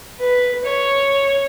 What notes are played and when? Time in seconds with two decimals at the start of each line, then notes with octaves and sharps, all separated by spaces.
0.21 B4
0.65 C#5